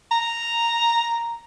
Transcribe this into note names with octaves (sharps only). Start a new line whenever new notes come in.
A#5